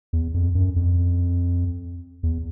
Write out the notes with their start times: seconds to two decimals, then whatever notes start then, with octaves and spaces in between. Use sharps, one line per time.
0.13 E2
0.34 F2
0.55 F#2
0.76 F2
2.23 E2